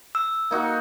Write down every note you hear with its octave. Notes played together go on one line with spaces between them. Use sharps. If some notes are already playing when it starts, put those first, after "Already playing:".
E6
A#3 D#4 F#4